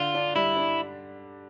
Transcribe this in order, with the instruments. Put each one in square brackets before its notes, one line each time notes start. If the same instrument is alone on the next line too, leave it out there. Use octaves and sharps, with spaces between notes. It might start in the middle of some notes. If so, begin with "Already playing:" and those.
Already playing: [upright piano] D3 [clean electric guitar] F4
[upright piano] D4
[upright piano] G3 [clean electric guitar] E4
[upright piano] D4